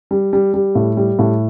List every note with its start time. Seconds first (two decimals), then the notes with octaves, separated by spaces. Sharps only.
0.11 G3
0.33 G3
0.54 G3
0.75 A2
0.97 G3
1.19 A2